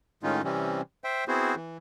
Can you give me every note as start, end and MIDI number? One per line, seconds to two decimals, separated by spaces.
0.23 0.42 45
0.23 0.42 51
0.23 0.42 56
0.23 0.42 61
0.23 0.42 63
0.23 0.42 65
0.44 0.81 48
0.44 0.81 52
0.44 0.81 55
0.44 0.81 60
0.44 0.81 61
1.04 1.24 72
1.04 1.24 76
1.04 1.24 79
1.28 1.55 59
1.28 1.55 60
1.28 1.55 64
1.28 1.55 66
1.28 1.55 68
1.28 1.55 72
1.56 1.77 52